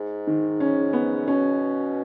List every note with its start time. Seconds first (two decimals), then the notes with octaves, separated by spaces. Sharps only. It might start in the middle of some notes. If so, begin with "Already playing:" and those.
Already playing: G#2
0.27 D#3
0.60 C#4
0.93 B3
1.27 B2 C#4